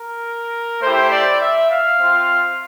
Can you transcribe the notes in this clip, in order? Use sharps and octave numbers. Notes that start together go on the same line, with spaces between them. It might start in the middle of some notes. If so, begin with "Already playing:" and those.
Already playing: A#4
A3 E4 G4 C5
D5
E5
F5
C4 F4